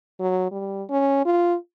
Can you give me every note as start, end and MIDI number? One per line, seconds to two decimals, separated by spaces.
0.20 0.48 54
0.52 0.83 55
0.89 1.23 61
1.25 1.56 65